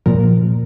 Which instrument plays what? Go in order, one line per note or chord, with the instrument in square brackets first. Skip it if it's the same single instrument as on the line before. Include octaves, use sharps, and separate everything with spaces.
[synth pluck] A#2 F3 A#4